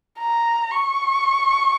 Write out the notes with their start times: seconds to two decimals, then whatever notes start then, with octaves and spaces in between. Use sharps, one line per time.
0.19 A#5
0.71 C#6